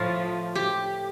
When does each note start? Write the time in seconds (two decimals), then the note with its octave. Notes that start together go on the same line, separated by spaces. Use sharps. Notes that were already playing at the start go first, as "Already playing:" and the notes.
Already playing: A2 F3 F4
0.55 G4